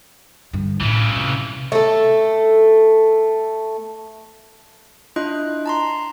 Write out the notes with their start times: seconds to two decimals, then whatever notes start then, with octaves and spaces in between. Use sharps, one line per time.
0.53 G2 D3
0.81 A2 C#3 E3 E4
1.16 C3
1.72 A3 A4
5.16 D4 E4 F4 D#5 F#6
5.66 A5 A#5 C6